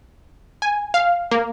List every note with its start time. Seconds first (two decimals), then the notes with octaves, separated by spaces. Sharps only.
0.62 G#5
0.94 F5
1.31 A#3